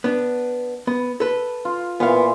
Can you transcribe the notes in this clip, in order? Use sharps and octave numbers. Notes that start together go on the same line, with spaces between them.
B3 D4
B3
A4 B4
F4
A#2 E3 B3 C5 F5